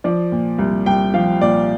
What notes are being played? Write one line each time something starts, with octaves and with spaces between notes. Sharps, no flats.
F3 D5
A#2
C2
C2 G5
F3 F5
A#2 D5